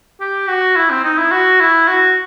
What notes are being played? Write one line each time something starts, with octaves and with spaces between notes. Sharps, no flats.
G4
F#4
E4
C4
D#4
E4
F#4
E4
F#4